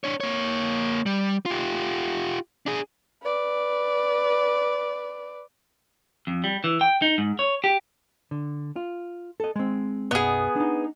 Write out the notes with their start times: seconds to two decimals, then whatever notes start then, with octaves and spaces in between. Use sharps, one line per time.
0.04 D4 C#5
0.20 A#3 C#5
1.06 G3
1.46 F4 G4
2.66 D4 G#4
3.23 B4 D5
6.27 F2
6.44 G3
6.64 E3
6.81 G5
7.02 D#4
7.18 G#2
7.39 C#5
7.64 G4
8.31 D3
8.76 F4
9.40 A4 D#5
9.56 G#3 C4
10.11 B1 F#2 B3 G#4 D#5
10.56 D4 D#4